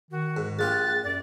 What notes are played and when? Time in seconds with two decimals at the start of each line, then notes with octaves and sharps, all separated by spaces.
0.11 D#3 F#4
0.37 G#2
0.59 A#1 F4 G4 G#4 F#6 A6
1.04 F#2 D5